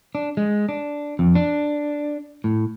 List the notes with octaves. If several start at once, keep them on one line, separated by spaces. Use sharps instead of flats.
D4
G#3
D4
F2
D4
A2